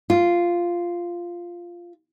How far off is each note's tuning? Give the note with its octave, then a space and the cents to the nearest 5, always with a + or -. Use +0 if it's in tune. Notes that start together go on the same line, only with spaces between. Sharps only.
F4 -5